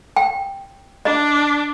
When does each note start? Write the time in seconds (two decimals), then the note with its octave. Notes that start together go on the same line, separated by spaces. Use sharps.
0.16 G5
1.05 D4 D#5